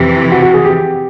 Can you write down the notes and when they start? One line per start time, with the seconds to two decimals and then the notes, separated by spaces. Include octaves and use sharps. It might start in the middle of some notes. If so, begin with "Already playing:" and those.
Already playing: F2 C3 E3 G4
0.32 F#4
0.42 F#4
0.54 G#4
0.65 G4